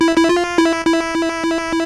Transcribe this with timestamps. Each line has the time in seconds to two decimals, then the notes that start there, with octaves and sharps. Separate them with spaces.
0.01 E4
0.17 E4
0.29 F4
0.58 E4
0.86 E4